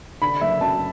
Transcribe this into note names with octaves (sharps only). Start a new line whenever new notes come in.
D3 B5
F#1 E5
F#2 A5